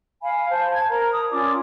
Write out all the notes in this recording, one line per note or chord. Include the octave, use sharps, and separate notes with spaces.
F5 G#5 B5
C5 A5
G#6
A#4 A#5
D#6
C#4 F4 D5 D6